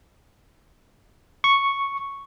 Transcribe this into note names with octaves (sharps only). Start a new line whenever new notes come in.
C#6